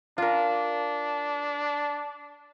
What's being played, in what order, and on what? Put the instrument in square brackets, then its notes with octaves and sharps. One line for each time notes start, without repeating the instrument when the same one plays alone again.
[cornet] D4 [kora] F4 A#4